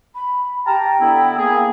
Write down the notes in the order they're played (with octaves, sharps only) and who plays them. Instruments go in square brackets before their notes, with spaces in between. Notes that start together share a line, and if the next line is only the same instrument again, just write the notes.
[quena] B5
[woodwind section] G4 A5 A#5 [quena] G5
[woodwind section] D3 B3 E4
A#3 G#4